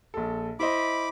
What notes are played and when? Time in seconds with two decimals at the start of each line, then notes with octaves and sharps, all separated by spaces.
0.14 A#1 A4
0.60 E4 C5 D#5 B5 D6